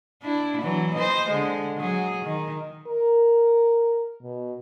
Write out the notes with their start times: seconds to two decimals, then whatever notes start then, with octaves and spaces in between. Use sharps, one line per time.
0.22 D4 E4
0.61 E3 F#3
0.94 C5 D#5
1.29 D3 G#3
1.79 F#3 G#4
2.25 D#3
2.87 A#4
4.22 B2